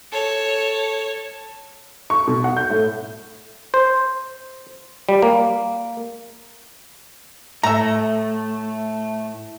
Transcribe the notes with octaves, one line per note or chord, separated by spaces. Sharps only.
A4 C#5
C#6
B2
F#5
G6
A2
C5
G3
A#3
A2 A3 E5 A#5